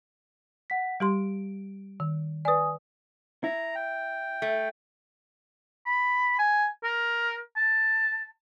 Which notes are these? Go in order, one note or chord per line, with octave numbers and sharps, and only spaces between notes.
F#5 B6
G3 G4 C6 D7
D#3
B4 D5 G#5 D#6
E4 A#5
G5
A3
B5
G#5
A#4
A5